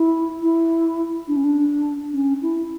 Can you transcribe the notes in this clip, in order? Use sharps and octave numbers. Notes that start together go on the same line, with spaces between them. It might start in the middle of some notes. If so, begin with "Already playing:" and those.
Already playing: E4
E4
D4
C#4
D4
C#4
E4